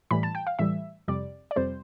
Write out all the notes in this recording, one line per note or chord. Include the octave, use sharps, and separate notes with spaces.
A2 E3 G3 B5
A5
G5
F5
A2 E3 G3 E5
F2 C3 G3 D5
D5
F2 C3 G3 C5